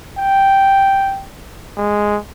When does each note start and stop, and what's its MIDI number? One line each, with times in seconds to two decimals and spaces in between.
0.19 1.24 79
1.78 2.19 56